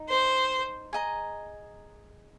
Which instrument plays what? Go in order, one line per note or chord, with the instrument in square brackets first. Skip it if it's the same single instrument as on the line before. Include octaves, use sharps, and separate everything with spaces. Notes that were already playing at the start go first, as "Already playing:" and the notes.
Already playing: [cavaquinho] D#4
[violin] C5
[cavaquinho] G#4 D#5 A#5